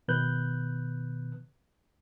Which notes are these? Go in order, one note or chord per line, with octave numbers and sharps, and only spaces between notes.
B2 D#3 B3 B4 F#6 G6